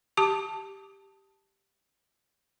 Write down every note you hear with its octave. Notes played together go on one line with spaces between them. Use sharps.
G4 A5 D6